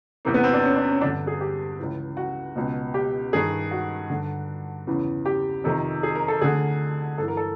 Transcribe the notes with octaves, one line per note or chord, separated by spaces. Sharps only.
E2 C3 E3 A#3
B3
C4
D4
C#4
D4
C#4
G2 D3 D4
G#4
G4
C#2 C#3 E3
F#4
C#2 B2
G4
G2 D#3 G#4
F#4
G2 D3
E2 C#3 E3
G4
F2 C3 D#3
G#4
A#4
A4
D2 D3 G#4
G2 E3 A4
A#4
A4